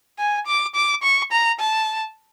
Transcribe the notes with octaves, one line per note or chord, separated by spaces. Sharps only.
G#5
D6
D6
C#6
A#5
A5